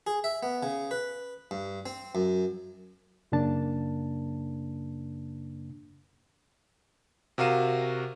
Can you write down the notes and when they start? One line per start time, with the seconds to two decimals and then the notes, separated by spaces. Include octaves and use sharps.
0.07 G#4
0.24 E5
0.43 B3
0.63 C#3
0.91 B4
1.51 G2
1.86 C4
2.15 F#2
3.32 F#2 C#3 A#3 D4 A5
7.38 C3 F#4 A#4 F5 D#7 E7